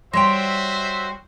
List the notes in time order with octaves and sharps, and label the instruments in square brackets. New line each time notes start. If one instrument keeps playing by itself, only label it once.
[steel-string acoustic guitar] G3 C#5 G5 [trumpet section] F#4 C5 E5 [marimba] C6 A#6